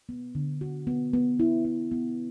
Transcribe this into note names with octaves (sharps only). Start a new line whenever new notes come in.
B3
D3
F#4
B3
B3
E4
E4
B3